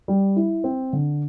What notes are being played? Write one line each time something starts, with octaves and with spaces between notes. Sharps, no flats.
G3
E4
C4
D3